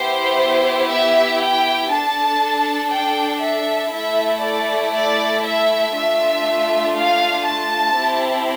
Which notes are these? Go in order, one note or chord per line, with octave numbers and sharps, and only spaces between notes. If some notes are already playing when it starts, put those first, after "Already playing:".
Already playing: B3 E4 G4 C5
E5
G5
D4 A4 A5
G5
E5
A3 E4 A4 E5
D5
D5
E5
A3 D4 F4 E5
F5
A5
C4 E4 G4